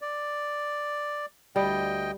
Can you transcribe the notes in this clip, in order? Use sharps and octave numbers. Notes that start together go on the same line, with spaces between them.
D5
D2 G3 D#5 G5